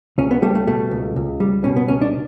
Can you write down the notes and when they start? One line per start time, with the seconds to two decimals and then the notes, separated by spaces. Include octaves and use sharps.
0.18 C#2 C#4
0.31 B3
0.42 G3 A3
0.55 A3
0.67 B2 A3
0.91 C#2
1.16 C#2
1.40 G3
1.64 B2 C#4
1.76 B3
1.88 C#2 C#4
2.01 D4